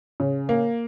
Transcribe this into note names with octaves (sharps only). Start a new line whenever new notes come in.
C#3
A#3